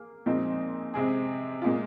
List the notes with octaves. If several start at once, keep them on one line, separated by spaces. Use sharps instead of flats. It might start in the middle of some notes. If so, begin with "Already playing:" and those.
Already playing: A#3 G#4
A#2 F3 G#3 C4 D#4
C3 G#3 C4 G#4
A#2 G#3 F4